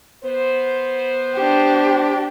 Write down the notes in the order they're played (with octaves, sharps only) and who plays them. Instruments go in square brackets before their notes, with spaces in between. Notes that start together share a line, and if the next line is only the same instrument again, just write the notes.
[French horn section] B3 C5
[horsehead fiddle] D4 G4